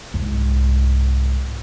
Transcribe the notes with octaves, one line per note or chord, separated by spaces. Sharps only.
C2 G#2